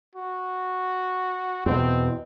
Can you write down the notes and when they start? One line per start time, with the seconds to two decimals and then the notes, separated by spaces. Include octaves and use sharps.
0.16 F#4
1.66 E2 B2 C4